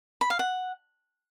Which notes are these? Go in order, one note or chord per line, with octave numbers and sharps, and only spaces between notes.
B5
F5
F#5